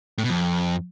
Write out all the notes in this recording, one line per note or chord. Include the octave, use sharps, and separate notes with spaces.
A2
B2
F2